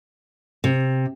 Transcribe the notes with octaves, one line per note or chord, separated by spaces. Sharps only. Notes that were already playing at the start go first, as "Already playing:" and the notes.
C3